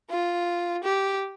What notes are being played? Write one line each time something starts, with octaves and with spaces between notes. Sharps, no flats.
F4
G4